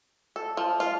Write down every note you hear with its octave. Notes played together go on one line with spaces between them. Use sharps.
A4
F3
F4